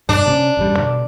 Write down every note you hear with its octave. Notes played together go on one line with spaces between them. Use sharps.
G2 B2 D4
C3 A#3 C#4
A1 F#2 G3
B2 D3